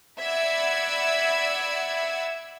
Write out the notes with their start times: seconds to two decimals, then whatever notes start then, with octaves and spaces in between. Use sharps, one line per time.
0.22 D5 E5 F#5 B5 E6 G#6